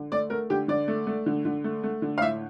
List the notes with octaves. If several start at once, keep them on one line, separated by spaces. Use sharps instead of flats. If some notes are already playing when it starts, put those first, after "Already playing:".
Already playing: D3
A3 D5
A3 A#4
D3 G4
D3 D5
A3
A3
D3
D3
A3
A3
D3
F5
A2 E5